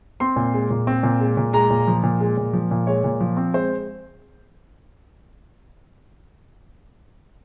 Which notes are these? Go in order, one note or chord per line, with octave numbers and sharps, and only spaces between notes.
C4 C6
A#2
G#3
A#2
C4
A#2
G#3
A#2
G#3 A#5
A#2
F3
A#2
G#3
A#2
F3
A#2
G#3 C#5
A#2
F3
C4
G#3 C5